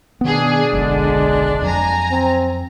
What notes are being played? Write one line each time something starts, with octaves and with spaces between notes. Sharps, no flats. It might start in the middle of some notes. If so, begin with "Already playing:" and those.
B2 D#3 B3 D4 G#4
F#1 B1 D3 G#3
F2 F#3 G#5 A#5
C4